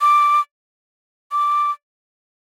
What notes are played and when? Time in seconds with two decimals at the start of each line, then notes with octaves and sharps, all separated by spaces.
0.01 D6
1.32 D6